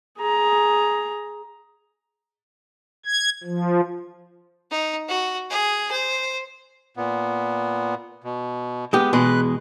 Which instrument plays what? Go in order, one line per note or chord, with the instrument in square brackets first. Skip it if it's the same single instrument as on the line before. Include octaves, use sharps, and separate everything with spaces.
[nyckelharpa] G#4 A#5
[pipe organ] G#6
F3
[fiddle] D#4
F#4
G#4
C5
[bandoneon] A#2 B3
B2
[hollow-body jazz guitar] G#3 B3 G4
[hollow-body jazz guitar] E2 B2 G#3 [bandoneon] B4 F#6